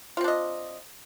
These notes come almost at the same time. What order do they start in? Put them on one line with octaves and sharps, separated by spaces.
F4 C4 D4 D#5